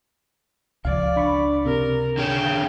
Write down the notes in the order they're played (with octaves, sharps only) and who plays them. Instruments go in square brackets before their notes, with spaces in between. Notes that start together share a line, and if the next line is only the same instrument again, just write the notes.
[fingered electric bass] C#2 C#3 F3 [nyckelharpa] D5 [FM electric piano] F5
[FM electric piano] D4 B5 C#6
[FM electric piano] C3 [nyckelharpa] A#4
[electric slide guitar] D3 G#4 C#5 [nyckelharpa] G5